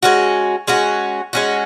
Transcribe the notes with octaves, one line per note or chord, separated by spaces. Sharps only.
G#3 C#4 F#4
G#3 C#4 F#4
G#3 C#4 F#4